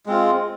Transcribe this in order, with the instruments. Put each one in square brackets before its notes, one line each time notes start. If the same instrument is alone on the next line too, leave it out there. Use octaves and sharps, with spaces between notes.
[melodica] G#3 C4 F4